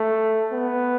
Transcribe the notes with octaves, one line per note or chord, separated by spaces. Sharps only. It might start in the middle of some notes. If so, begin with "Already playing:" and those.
Already playing: A3
B3